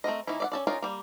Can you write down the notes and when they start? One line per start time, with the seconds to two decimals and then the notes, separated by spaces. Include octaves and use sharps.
0.04 A3 C4 A#4 D#5
0.27 D#3 A#3 C#4 E4
0.40 D5 E5 F#5
0.52 C#4 A4 D5
0.67 C#4 D#4 F4 A#4 D5
0.82 G3 A#3